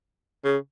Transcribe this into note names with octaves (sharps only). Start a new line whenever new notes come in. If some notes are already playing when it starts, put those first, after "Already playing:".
C#3